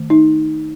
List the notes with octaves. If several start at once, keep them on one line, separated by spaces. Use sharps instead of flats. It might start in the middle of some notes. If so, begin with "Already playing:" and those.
Already playing: D#3 A3
D#4